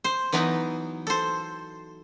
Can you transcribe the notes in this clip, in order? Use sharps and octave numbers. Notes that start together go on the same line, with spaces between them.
C5
E3 F#3 B3 D#4
A4 C5